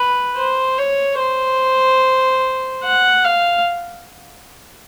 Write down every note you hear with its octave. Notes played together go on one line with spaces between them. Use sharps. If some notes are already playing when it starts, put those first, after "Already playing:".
Already playing: B4
C5
C#5
C5
F#5
F5